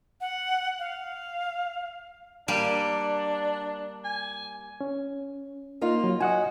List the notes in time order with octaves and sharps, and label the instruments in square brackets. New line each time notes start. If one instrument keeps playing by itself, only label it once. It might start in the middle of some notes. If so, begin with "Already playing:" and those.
[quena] F#5
F5
[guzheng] G3 A#3 [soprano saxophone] D4
[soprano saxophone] G#5
[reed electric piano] C#4
[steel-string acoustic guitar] A#3 D#4 F4
[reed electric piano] F#3
[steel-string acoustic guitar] F#4 [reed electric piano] D#5 F#5 G#5